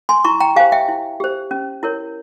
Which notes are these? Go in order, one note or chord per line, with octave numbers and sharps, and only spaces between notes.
G#5 C6
E4 A#5 C#6
G5 A#5
G4 C5 F5 G#5
E5 G5
E4
G4 C5
C#4
E4 A#4 C#5